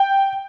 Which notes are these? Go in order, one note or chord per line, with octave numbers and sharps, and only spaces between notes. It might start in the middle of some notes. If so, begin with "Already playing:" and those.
Already playing: G5